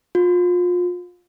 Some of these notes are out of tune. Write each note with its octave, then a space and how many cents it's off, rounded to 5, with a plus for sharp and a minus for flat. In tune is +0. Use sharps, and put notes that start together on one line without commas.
F4 +30